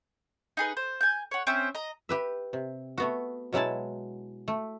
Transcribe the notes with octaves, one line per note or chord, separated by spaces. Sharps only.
D#4 G#4 B4
C5
G#5 G6
C#5 F#5
C4 C#4 C5 E5
D#5 A#5
G4 B4 E5
C3
A3 B3 F#4
B2 F#3 G#3 E4 A5
A3